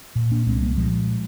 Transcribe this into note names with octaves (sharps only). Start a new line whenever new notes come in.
A#2
A#3 D4
C2 G#3 C4
G3 A#3
A#2 F3 G#3